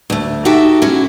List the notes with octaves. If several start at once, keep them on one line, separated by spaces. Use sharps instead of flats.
D2 A3
D#4 F#4 G4 A4 E5
F#3 G#3 C#4 E4